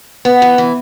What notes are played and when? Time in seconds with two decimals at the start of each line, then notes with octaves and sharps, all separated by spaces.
0.25 B3
0.42 E3
0.58 E3